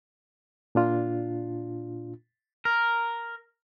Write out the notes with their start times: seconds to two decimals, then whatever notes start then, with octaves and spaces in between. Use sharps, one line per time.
0.75 A#2 D4 F4
2.65 A#4